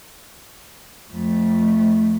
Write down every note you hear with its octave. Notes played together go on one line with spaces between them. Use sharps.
F2 A3